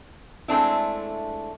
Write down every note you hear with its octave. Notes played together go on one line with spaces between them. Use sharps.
G#3 A3 C4 D4 E4